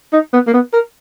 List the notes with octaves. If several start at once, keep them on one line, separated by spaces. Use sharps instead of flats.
D#4
B3
A#3
B3
A#4